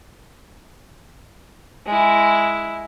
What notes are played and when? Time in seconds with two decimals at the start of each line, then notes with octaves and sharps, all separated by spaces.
1.86 G#3 E4